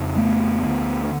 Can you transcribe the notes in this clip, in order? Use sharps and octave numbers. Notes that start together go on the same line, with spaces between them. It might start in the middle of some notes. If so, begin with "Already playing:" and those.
Already playing: F2 C#3
A3 B3
D2 D3